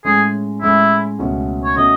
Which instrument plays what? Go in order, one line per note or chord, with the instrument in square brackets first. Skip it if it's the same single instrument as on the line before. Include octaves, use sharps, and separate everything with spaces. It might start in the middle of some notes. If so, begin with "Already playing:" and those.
[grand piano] A2 G#3 C#4 [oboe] G#4
[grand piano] A2 G#3 C#4 [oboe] E4
[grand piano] C#2 B2 A3 C#4
[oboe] C#5
[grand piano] B2 A3 C#4 [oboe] D#5